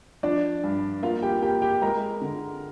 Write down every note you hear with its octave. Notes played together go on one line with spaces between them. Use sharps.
F3 D4 D5
G2
A#3 F4 F5
G4 G5
A#3 G4 G5
G4 G5
G#3 A#4 A#5
D3